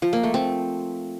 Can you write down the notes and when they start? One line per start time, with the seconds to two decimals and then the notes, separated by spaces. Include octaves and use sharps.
0.02 F3
0.13 A#3
0.23 A3
0.34 C4